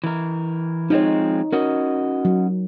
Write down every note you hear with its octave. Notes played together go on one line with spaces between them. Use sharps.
E3 A#4
F3 G#3 C4 D#4 C#5
C#4 F#4 A#4 D#5
F#3